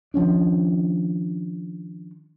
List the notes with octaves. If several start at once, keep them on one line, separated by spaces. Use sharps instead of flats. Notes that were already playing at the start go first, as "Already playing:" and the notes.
D#3 F3 C#4 D4